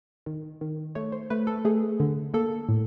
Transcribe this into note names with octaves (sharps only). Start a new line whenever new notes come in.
D#3
D#3
A3 C#5
C5
A3 B4
A4
A3 G#4
D3
A#3 A4
A2